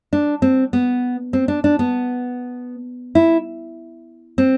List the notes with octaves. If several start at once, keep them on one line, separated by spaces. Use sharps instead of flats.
D4
C4
B3
C4
D4
D4
B3
E4
C4